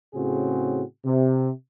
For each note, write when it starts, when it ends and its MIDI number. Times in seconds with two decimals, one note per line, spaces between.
0.14 0.83 45
0.14 0.83 49
0.14 0.83 60
0.14 0.83 66
0.14 0.83 68
1.05 1.49 48